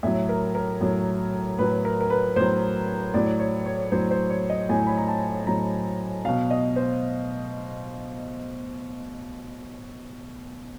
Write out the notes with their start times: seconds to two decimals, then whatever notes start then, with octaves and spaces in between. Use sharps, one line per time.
0.03 A2 F#3 E5
0.29 A#4
0.55 A#4
0.81 A2 F#3
1.58 A2 F#3 B4
1.85 A#4
2.01 A#4
2.10 B4
2.36 A2 F#3 C5
3.14 A2 F#3 D5
3.39 C#5
3.66 C#5
3.92 A2 F#3 C5
4.11 C5
4.30 C#5
4.50 D#5
4.69 A2 F#3 G#5
4.86 B5
4.98 A#5
5.08 A5
5.47 A2 F#3 A#5
6.25 B2 F#3 F5
6.50 D#5
6.76 C5